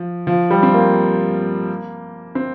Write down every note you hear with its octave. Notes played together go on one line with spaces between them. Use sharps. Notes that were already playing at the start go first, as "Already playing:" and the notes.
Already playing: F3
F3
G3
C4
A#3
C4